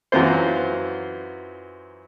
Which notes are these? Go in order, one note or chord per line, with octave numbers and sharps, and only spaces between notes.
F#2 E3 F#3 F4 C5